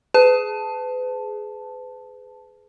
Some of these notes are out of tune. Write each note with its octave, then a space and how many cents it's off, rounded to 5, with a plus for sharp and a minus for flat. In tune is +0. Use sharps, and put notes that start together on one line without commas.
G#4 +15 B4 +35 A5 +0